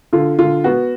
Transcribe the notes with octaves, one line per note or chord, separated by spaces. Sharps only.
D3 F4
D3 F4
B3 F#4